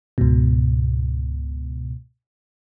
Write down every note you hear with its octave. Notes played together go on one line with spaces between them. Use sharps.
C#2 G#2 B2